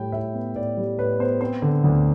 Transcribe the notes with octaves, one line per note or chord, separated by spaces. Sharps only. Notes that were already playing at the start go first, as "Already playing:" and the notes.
Already playing: A2 G3 G5
A2 E5
B3
A2 D5
G3
A2 B4
B3 C5
C4 C5
D3
D2